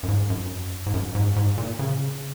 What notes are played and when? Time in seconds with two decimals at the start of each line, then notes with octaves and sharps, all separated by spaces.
0.03 F#2
0.08 G#2
0.30 F#2
0.86 G#2
0.94 F#2
1.15 G#2
1.36 G#2
1.58 A#2
1.79 C#3